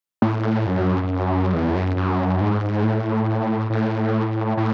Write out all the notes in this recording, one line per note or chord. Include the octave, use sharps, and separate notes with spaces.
A2
F#2
E2
F#2
F#2
G#2
A2
A2
A2